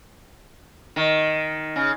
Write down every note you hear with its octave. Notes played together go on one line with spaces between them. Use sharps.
D#3
C#3